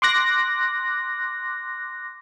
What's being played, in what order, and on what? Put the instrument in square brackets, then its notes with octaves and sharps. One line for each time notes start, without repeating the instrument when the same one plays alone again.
[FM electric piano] C6 D6 F#6 A#6